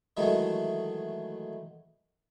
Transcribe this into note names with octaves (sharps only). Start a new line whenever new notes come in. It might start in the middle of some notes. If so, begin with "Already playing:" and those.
D#3 E3 F#3 G#3 A3